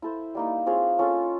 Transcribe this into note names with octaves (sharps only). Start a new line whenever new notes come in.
E4 A4 C5
G3 A#3 D#4
C4 F4 G#4 C#5
C#4 F4 A4